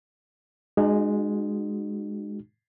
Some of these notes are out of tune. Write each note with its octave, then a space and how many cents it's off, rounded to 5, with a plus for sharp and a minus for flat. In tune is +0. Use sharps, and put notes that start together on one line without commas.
G#3 +0 D#4 -45 F#4 +0